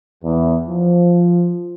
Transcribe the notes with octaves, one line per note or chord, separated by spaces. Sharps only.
E2
F3